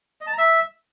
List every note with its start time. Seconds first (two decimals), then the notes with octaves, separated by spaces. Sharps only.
0.21 D#5
0.27 A5
0.32 A#5
0.38 E5